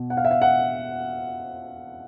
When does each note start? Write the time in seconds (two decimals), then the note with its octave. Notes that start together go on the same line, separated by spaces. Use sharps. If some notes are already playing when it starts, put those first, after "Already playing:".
Already playing: B2
0.10 F#5
0.17 F5
0.25 E5
0.31 F5
0.42 F#5